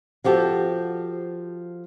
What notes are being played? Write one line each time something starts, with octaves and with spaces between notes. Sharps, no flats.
F3 F#4 G4 A4